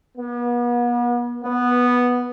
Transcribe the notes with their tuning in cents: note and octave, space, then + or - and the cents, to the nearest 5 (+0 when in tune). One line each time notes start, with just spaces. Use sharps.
B3 -40
B3 -5